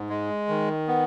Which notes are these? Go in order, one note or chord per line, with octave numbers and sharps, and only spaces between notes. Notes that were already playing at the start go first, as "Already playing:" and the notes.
Already playing: G#2
G#3
D#3
B3